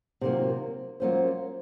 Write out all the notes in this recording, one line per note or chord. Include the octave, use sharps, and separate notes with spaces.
C3 D#3 F#3 A#3 F4
F#3 A#3 C#4 F4 C5